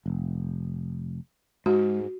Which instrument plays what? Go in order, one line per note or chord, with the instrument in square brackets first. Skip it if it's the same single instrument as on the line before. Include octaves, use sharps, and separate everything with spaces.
[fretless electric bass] F1
[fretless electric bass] G#2 [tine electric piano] G#3 [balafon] F#4